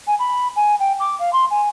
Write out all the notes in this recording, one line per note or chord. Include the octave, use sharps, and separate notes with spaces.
G#5
B5
G#5
G5
D6
F5
C6
G#5